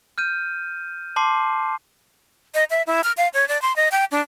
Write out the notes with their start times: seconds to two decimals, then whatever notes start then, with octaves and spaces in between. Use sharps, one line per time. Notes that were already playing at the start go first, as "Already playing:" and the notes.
0.18 F6 G6 D#7
1.16 A5 C6 D6 C7
2.54 D#5
2.70 E5
2.87 E4
3.04 F6
3.17 F5
3.34 C#5
3.48 D5
3.62 C6
3.76 D#5
3.92 G5
4.11 D4